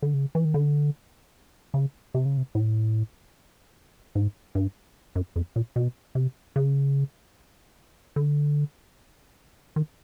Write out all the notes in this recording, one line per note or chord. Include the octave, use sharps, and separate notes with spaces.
D3
C#3
E3
D#3
D3
C#3
C3
C#3
C3
A2
G#2
G2
F#2
F2
A#2
B2
C3
C#3
D3
D#3